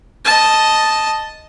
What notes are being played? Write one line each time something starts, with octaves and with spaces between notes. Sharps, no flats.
D#5 A5